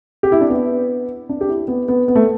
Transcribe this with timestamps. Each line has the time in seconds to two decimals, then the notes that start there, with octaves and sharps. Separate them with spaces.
0.23 G4
0.32 E4
0.41 D4
0.50 B3
1.29 D4
1.41 G4
1.49 E4
1.68 B3
1.88 B3
2.08 B3
2.15 A3